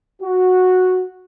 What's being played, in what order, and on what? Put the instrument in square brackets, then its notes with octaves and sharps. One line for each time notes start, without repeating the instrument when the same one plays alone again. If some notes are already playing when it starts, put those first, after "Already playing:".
[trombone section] F#4